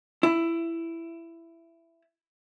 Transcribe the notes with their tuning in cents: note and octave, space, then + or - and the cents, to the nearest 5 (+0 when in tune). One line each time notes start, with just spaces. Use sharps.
E4 +15